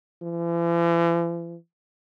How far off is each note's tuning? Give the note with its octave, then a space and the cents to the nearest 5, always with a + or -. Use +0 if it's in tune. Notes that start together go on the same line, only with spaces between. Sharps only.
E3 +45